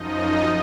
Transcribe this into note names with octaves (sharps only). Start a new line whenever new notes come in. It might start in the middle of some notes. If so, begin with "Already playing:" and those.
Already playing: F#2 F3 D#4 D#5